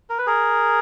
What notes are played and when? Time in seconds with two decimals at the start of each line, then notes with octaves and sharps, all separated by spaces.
0.10 A#4
0.18 B4
0.26 G#4 A#4